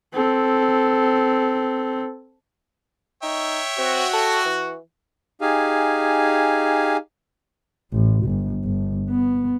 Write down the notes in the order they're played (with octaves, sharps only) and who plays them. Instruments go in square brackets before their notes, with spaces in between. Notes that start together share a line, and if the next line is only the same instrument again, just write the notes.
[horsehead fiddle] C4 A4
[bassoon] D#4 [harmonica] C#5 E5 G5
[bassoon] C4 [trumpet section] F#4
[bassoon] A4
E3
[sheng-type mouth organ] D#4 G4 G#4 F5 G#5
[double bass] A1
G1
G1
B3